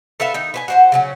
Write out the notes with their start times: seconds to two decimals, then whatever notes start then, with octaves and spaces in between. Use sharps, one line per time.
0.20 A4 B4 E5 F5
0.34 D#3 D#4
0.54 B4 C5 G#5
0.68 F#4 C5 F#5
0.92 C#3 F#3 C#4